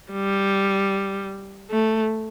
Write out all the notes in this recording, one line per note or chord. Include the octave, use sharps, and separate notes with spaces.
G3
A3